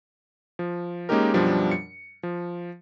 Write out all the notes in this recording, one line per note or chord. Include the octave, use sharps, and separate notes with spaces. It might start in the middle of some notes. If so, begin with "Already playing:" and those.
F3
G#3 A#3 C#4 D#4 G4 A#4
F#2 B2 F3 G3 D4
C#7
F3